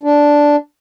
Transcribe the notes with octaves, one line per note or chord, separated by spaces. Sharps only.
D4